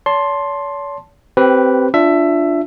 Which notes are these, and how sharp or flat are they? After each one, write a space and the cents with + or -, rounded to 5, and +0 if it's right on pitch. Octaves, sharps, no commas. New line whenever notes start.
C#5 +45 A5 +0 C6 +10
C4 +0 G4 -25 B4 +0
D4 +0 F4 -5 E5 +15